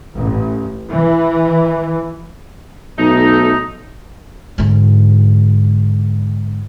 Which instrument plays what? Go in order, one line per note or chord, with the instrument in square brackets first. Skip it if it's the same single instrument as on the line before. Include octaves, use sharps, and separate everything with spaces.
[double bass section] A1
E3
[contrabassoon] B1 [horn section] A3 D#4
[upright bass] G#2 D3